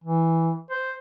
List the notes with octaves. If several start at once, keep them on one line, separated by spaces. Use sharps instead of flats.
E3
C5